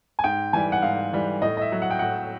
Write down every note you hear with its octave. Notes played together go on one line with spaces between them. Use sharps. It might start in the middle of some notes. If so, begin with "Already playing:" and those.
G#5
G#2 G5
E3 G3 G#5
F#5
G#2 F5
E3 G3
A2 D#5
D#5
E5
F#3
F#5
G5
A2 F#5